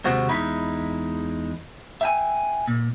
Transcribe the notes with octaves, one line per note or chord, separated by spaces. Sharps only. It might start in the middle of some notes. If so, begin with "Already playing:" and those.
D#2 C3 G#3 F#4 C5
E2 G#3 D#4 E4 B5
E5 G5 G#5
A#2